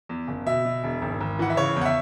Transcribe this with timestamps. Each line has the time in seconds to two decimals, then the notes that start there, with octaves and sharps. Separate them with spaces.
0.09 E2
0.28 F#1
0.46 B2 E5
0.65 B2
0.84 E1
1.02 G#1
1.21 G#1
1.39 E3 F#5
1.50 E5
1.57 C#3 C#5
1.76 E2
1.81 F#5
1.85 E5